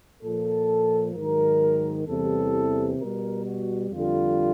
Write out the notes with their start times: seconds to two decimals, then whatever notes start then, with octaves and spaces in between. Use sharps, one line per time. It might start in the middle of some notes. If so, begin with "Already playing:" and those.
0.22 A#2 F3 A4
1.14 G#2 D#3 F#3 A#4
2.07 E2 C3 E3 G3 A4
2.98 B2 G3 A#4
3.45 F#4
3.91 F2 D3 G3 F4